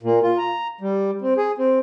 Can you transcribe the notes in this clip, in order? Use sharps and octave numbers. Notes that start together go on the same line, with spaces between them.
A#2
F4
A#5
G3
C4
G#4
C4